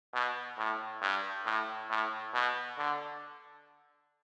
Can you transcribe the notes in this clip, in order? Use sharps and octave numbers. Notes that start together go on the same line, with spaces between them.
B2
A2
G2
A2
A2
B2
D3